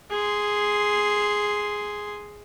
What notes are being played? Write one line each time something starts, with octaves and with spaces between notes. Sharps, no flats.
G#4 C6